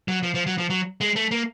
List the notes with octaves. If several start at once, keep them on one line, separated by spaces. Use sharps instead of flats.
F#3
F3
F3
F#3
F3
F#3
G#3
A3
A#3